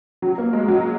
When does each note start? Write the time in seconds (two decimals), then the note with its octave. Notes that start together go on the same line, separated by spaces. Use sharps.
0.22 F#3
0.38 A#3
0.53 G#3
0.68 F#3